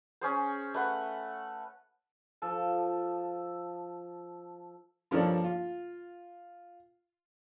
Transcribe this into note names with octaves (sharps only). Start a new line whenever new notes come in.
C#4 G#4 C5
A3 B4 F#5
F3 A4
G2 F3 A#3 A4 C#5 D5
F4